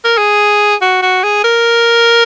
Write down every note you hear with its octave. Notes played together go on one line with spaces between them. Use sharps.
A#4
G#4
F#4
F#4
G#4
A#4